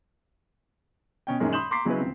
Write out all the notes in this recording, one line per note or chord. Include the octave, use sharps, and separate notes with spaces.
B2 C#4 G5
F#2 A#2 D#3 G#3 C#4
B5 C6 D#6 G6 E7 F#7
A#5 C6 D6 B6 C7
C#3 F#3 G#3 C#4 E4 B4
D#1 C4